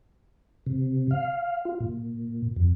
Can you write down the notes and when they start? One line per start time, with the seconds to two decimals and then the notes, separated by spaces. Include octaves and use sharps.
0.66 C3
1.11 F5
1.65 F4
1.80 A#2
2.56 F2